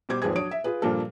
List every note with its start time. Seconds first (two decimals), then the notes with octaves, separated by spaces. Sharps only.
0.09 B2 G3 C5 D6 G#6
0.22 G#1 D#2 F3 B3 G#4 G#6
0.35 F#3 D4 C#5 D#6 D7
0.51 E5
0.64 F4 G#4 B4
0.82 G2 A#2 F3 A#3 A4